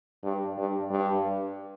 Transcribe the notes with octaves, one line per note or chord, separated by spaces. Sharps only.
G2
G2
G2